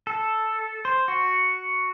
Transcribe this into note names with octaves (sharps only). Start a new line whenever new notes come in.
A4
C5
F#4